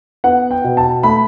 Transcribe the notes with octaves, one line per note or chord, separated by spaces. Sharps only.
B3 F#5
G5
B2
A5
A3 B5